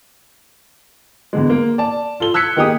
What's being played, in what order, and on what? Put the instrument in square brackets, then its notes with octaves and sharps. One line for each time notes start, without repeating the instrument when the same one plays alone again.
[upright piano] E2 D3 G#3
A#3
D5 A5
F4 A4 G7
E6 F#6 G#6 B6 C#7
D#3 A#3 D#4 G4 G#4 D#6